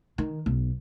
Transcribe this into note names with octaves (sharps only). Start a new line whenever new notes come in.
D#3
B1